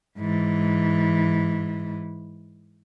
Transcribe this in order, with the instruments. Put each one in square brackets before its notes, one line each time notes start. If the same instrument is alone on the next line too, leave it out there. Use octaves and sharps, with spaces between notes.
[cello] G#2 E3